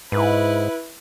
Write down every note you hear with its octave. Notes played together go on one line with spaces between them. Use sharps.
G#2 E4 B4